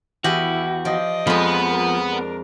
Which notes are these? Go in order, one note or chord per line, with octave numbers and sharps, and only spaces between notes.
E2 E4 F#4 G4 D#5
F3 D5 D#5
F2 F3 G#3 B3 B4
A#4
D4 A#4